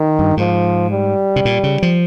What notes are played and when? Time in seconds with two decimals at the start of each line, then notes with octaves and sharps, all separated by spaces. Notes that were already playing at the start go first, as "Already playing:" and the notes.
Already playing: D#3
0.19 G2
0.37 G#2 F3
0.91 G3
1.36 C3
1.45 A#2
1.63 C#3
1.83 F3